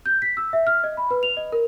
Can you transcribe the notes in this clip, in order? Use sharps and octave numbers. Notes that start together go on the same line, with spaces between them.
G6
B6
E6
E5
F6
D#5
B5
B4
F7
D#5
A#4